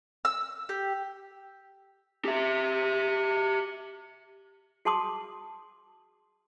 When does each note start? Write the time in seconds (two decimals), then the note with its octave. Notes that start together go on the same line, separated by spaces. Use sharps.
0.25 E6
0.69 G4
2.25 G4 E5
4.85 F#4 G#4 A5 C6 D6 D#6